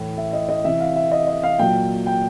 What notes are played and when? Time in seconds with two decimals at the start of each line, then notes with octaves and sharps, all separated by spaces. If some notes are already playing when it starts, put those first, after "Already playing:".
Already playing: A2 E3
0.17 E5
0.33 D#5
0.49 D#5
0.64 C3 E3 E5
0.80 F5
0.96 E5
1.12 D#5
1.27 D#5
1.43 F5
1.59 A#2 F#3 G5
2.07 G5